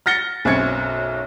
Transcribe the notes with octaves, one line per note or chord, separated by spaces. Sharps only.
F6 A6 A#6 C#7 G7
B1 F#2 C4 C#6 G#6 C#7